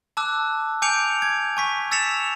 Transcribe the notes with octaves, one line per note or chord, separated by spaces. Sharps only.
A5 D6 E6 F#6
G#5 D6 G6 C#7 D7 F7
G#6
G#5 C#6 B6
E6 A6 B6 C#7 E7 F7